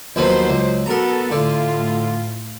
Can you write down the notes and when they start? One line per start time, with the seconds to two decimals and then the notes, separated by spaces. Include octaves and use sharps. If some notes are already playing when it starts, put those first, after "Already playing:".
0.16 D#2 F3 F#3 B3 C5
0.50 C#2
0.86 B3 F#4 A4 A#4 A#5
1.31 A2 D3 F4